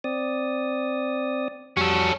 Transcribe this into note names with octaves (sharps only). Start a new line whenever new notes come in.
C4 D5 D#6
F2 G3 C#4 F#4 A4